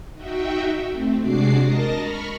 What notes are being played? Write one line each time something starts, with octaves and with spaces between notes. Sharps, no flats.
D#4 F#4 E5 G5
A3 C4
C3 G#3 D4 F#4 D6 C7
A#4 D#5 A5 A#6
B5 C#6 F6